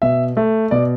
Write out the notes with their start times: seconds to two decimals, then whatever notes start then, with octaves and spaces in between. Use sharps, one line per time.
0.02 B2 E5
0.37 A3
0.71 B2 D5